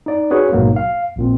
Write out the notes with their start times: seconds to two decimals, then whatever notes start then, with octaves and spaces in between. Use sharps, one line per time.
0.06 D#4 D5
0.31 C#4 F#4 G#4 B4 C#5
0.52 A#1 G#2 B2 F#3 A#3
0.76 F5
1.16 A#1 A#2 C4